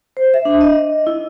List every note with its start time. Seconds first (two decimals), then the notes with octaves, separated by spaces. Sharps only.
0.17 C5
0.34 E5
0.45 D4
0.61 D#5
1.07 E4